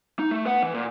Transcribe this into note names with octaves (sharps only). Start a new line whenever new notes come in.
D#4
A3
B3 F#5
E3
A#2